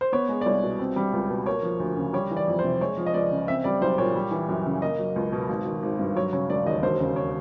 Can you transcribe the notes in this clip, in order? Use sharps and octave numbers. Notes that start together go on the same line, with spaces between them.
C5
B3 C#5
G#3
D5
C2 C#5
B2
C4
G3
C#2
B2
A#3 C#5
F3
D2
C#3
G3 C#5
E3
D5
F2
C5
C3
G#3 C#5
F3
D#5
C#2 D5
C#3
C4 E5
G3 D5
B1 C5
A#2 C#5
G3
E3
F#2
C#3
A#3 D#5
F#3
C#2
B2
G#1
D#3
G#1
G2
F#3 C#5
C#3 C#5
E1 D5
D#2 D#5
E1 C5
C#3
C#5